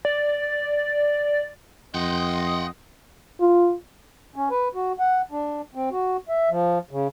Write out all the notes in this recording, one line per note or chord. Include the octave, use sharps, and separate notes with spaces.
D5
F2 D#5 F#5 G5 C6 D#6
F4
C#4
B4
F#4
F#5
D4
C4
F#4
E5
F3
C#3